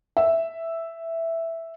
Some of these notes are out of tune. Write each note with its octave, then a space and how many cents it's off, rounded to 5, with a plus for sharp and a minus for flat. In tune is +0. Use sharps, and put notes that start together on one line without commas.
E5 +0